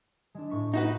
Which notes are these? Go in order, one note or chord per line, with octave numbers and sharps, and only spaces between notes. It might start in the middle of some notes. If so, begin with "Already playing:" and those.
G#3 D4
A2 C#6 B6
D#4 F#4 B4